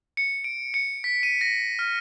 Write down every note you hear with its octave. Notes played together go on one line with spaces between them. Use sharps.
C#7
D7
C#7
B6
D#7
A#6
F6